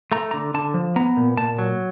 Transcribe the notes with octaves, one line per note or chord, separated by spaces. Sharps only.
A3 A#5
D3 A#5
D3 A5
F3
B3 A#5
A#2
A#2 A5
F#3